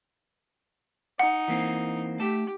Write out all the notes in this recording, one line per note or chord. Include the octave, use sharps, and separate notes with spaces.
D#4 F#5
E3 A#3 C4
A3 G4 A5